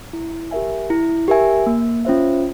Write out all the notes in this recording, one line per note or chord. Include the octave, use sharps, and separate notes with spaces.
E4
G4 A#4 E5 G#5
E4
G4 A#4 E5 G#5
A#3
C#4 F4 C5 E5